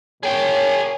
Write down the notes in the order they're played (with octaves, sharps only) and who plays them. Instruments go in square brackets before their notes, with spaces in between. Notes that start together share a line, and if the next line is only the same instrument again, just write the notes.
[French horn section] A#2 C#5 [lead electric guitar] G#4 G5